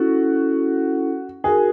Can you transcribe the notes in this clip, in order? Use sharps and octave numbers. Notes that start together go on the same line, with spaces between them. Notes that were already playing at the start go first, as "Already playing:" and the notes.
Already playing: C#4 E4 F#4 A4
D#4 F#4 G#4 A#4